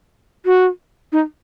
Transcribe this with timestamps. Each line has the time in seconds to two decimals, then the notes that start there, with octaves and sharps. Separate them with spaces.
0.46 F#4
1.12 D#4